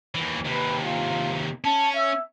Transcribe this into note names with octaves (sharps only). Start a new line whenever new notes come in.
D#2 E3
D#2 C3 B4
F4
C#4 A5
E5